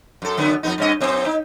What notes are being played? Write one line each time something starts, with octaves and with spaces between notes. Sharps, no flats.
F#2 A4
F#2 D3 B3
F2 B3 D#4
G2 C#4 D#5
F#2 B3
D#4